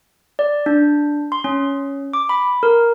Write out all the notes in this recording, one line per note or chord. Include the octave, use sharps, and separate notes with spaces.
D5
D4
C6
C#4
D6
B5
A#4